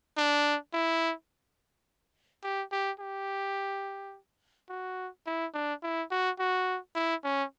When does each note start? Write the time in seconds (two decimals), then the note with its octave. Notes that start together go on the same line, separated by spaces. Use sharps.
0.17 D4
0.73 E4
2.43 G4
2.72 G4
2.99 G4
4.69 F#4
5.26 E4
5.54 D4
5.83 E4
6.11 F#4
6.39 F#4
6.95 E4
7.24 C#4